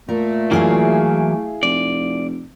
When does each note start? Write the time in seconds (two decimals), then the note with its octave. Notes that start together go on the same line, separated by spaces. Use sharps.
0.09 A#2 A3 A#4
0.51 E3 F#3 A#3 E4 G#4 F5
1.63 F1 D5